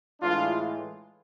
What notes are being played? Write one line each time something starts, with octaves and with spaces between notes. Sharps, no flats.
A2 E3 G#3 D4 F4